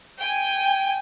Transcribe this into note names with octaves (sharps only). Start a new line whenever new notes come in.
G5 G#5